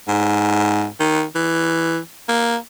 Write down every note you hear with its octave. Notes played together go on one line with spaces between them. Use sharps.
G#2
D#3
E3
A#3